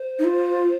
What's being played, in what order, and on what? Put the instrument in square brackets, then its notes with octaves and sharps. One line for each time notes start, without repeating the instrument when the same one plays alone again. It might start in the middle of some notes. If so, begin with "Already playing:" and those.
Already playing: [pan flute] C5
[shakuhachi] D#4
F4